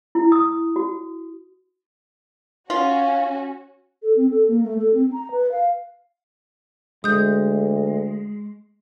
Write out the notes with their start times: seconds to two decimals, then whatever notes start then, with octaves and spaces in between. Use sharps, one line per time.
0.15 E4
0.32 D#6
0.76 F#4
2.70 C#4 F4 F#4
4.02 A4
4.16 C4
4.30 A4
4.48 A#3
4.63 A3
4.79 A4
4.94 C4
5.12 A#5
5.31 B4
5.52 F5
7.04 D2 G#3 D#6 G6